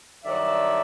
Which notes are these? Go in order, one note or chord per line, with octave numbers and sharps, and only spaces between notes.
G2 D#3 F#3 D5 E5